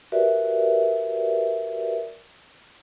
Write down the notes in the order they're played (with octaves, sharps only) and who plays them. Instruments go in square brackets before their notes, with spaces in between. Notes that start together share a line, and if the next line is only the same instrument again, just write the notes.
[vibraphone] F#4 G4 A#4 B4 D5 E5